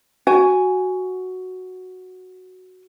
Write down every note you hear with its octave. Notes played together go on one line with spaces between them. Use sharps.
F#4 G#5